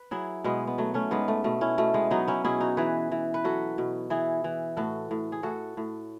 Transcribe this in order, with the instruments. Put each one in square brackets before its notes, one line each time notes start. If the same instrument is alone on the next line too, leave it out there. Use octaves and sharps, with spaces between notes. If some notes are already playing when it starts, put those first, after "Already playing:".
Already playing: [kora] B4
F#3 E4 G#4
B2 G#3 B3
B3
F#3 A3
A3 C#4
G#2 G#3 B3
A3
B2 A3
C#4 E4
B2 A3
G#3 B3
F#3 B3 D#4
C#4 E4
B2 E4 G#4
D#4 F#4
E3 G#4 B4
E3
B4
F#3 F#4 A4
B2
E3 E4 G#4
E3
A2 F#4 A4
A2
G#4
A2 F#4 A4
A2